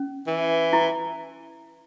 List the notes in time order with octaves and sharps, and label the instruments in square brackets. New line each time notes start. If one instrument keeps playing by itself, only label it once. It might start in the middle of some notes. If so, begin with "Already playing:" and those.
Already playing: [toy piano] C#4
[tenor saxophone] E3
[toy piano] E4